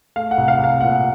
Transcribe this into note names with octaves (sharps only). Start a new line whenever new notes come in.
A3 F5
F#5
C2
F5
C2
F5
A#2 F#5